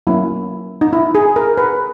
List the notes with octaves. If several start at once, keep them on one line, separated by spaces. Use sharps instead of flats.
F#3 A#3 C#4 E4
D#4
E4
G#4
A#4
B4